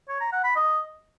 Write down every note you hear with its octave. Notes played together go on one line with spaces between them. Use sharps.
C#5
A#5
F#5
B5
D#5